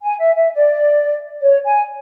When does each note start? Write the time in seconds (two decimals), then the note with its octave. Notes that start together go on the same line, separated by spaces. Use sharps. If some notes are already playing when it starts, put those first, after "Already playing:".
0.02 G#5
0.19 E5
0.36 E5
0.53 D5
1.41 C#5
1.64 G#5